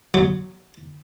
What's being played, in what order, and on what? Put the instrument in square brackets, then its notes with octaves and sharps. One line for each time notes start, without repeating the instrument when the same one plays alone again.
[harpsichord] F#3